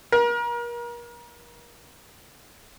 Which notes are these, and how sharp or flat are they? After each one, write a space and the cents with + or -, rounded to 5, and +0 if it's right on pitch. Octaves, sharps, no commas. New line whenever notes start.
A#4 +35